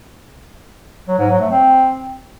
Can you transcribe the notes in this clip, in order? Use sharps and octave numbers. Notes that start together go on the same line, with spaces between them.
F#3
G#2
F#3
A3
C4